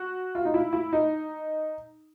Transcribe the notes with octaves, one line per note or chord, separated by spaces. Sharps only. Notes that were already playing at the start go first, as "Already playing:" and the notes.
Already playing: F#4
F4
D#4
E4
E4
D#4